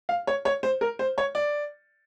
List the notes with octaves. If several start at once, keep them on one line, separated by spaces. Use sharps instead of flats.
F5
C#5
C#5
C5
A#4
C5
C#5
D5